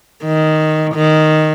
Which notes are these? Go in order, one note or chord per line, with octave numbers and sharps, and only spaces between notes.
D#3
D#3